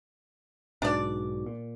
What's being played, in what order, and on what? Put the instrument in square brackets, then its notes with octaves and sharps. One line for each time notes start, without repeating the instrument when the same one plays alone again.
[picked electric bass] B1 G#2 B2 [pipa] D4 D5
[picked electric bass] A#2